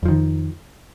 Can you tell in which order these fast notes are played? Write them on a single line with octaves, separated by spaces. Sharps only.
F2 F3 D#3